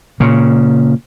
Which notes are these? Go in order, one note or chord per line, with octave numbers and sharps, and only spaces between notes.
A#2 C#3